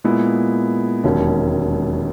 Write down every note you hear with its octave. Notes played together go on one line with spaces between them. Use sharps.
A#2 G#3 B3 E4
E1 D#2 D#3 F#3 C#4